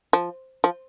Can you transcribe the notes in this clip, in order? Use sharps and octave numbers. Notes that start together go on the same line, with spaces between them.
F3
F3